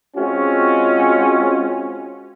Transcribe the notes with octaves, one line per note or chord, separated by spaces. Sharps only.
G#3 C4 C#4 F4 F#4